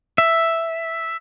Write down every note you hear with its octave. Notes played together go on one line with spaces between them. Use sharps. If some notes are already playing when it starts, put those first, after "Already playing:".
E5